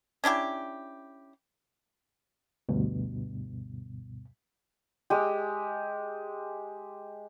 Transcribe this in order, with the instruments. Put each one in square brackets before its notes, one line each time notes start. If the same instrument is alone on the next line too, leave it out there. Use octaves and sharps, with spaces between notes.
[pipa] C#4 D4 E4 G4
[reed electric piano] D2 G2 B2
[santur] G#3 G4